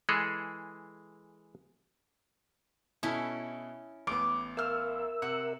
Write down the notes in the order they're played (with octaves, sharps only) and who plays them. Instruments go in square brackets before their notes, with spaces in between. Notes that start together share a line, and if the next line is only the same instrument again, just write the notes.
[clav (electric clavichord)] E3 G#3 G#4 A4
[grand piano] B2 A4 [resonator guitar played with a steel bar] C#4 E4
[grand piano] A1 B3 [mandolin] D6
[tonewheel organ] A#4 E5 E6 [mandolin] F5 F6
[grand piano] C3 [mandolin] F#5